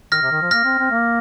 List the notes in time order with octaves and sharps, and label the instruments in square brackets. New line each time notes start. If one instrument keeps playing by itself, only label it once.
[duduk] D#3 [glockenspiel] F6 A#6
[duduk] C3
D#3
F3
[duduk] A#3 [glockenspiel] F6 A#6
[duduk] C4
C4
A#3